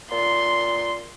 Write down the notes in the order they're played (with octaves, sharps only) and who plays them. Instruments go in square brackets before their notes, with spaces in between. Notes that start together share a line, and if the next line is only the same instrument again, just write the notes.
[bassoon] A#2 [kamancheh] C6